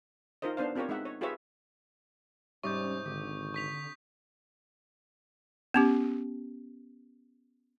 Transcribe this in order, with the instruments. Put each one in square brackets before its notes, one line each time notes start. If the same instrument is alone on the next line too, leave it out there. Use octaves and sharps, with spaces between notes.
[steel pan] D#4 F4 A#4 C5 D#5
B3 D4 C5 F5
C4 F4 G4 A#4 C#5
G#3 D#4 E5 F#5
C#5
F4 G4 G#4 B4 C#5 E5
[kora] G#2 C3 D5 [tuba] G3 [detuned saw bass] C#4 [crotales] C#6 D#6 G6
[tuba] G#1 [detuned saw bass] D3 [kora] G4
[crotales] C#6 B6 F7
[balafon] B3 C#4 G4